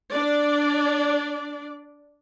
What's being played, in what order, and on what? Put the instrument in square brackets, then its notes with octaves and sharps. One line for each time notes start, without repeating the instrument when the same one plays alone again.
[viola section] D4 D5